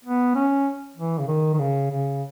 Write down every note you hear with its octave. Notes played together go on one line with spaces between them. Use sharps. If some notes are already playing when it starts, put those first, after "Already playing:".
B3
C#4
E3
C#3
D#3
D#3
C#3
C#3